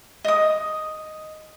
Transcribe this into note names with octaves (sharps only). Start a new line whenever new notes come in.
D#5 D#6